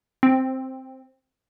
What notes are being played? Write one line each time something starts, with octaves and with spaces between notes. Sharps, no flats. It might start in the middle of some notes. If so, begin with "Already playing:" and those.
C4